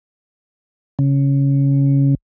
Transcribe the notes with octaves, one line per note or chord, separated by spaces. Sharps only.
C#3